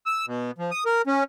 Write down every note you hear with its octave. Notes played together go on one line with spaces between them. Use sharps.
E6
B2
F3
D#6
A#4
C#4